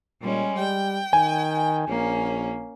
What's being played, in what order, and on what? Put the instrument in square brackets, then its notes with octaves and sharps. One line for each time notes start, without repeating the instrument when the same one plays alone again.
[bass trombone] A#2 [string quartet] G3 G#3 C#4
[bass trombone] G3 [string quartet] G5
[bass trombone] D#3 [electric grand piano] G#5
[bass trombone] A#1 [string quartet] A#3 C#4